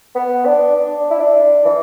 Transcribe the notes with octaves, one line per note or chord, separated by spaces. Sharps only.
B3
D4
D4
E4
D4
E3